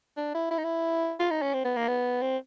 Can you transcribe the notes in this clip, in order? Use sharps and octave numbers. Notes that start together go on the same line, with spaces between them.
D4
E4
E4
D#4
E4
F4
D#4
C#4
C4
B3
A#3
B3
C4